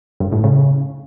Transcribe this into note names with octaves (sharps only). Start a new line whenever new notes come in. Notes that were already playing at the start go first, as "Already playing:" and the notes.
G2
A2
C#3